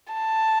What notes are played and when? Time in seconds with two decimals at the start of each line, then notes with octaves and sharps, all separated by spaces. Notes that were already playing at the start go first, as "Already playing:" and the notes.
0.14 A5